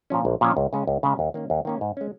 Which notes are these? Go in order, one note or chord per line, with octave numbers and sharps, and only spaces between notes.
A#2 F3 C#4
A#1
A#2 F3 C#4
C#2
C#3 G#3 C#4
C#2
C#3 G#3 C#4
D#2
D#3 A#3 C#4
D#2
D#3 A#3 C#4
G#2
G#3 C#4